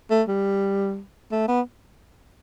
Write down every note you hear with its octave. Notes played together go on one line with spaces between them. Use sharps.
A3
G3
A3
B3